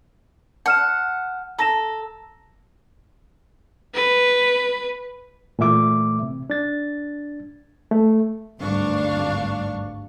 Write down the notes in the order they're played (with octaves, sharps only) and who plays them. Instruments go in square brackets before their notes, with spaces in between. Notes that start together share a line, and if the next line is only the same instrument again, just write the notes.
[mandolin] F#5 [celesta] A5 F6 E7
[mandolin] A4 [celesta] A#5 A#6 E7
[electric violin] B4
[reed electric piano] A#2 E3 A3 E5 D6
C3
D4 A6
A3
[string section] G#1 D2 G2 D4 F5 C#6